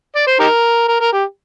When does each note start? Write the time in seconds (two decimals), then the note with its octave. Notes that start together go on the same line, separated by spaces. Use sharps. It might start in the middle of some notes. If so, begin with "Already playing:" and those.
0.16 D5
0.27 C5
0.39 D#4 G4 A#4
0.88 A#4
1.01 A#4
1.13 G4